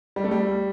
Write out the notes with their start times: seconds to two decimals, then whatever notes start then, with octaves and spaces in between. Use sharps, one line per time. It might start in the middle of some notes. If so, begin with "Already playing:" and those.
0.16 G3
0.24 A3
0.31 G3